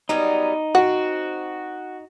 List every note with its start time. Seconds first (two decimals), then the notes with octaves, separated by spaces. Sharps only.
0.09 F#3 G3 B3 D#4
0.75 C4 F#4 F#5